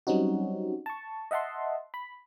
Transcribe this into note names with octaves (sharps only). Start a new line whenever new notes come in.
F#3 G3 C4 C#4 D#4 F#4
A5 C#6
D#5 E5 F#5 A5 C6
B5